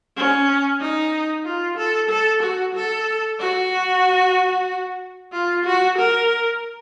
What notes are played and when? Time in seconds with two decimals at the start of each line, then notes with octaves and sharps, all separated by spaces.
0.16 C#4
0.81 D#4
1.44 F4
1.78 A4
2.10 A4
2.42 F#4
2.75 A4
3.38 F#4
5.33 F4
5.65 F#4
5.98 A#4